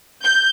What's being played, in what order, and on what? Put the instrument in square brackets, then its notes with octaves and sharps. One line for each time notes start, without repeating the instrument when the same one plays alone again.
[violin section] G6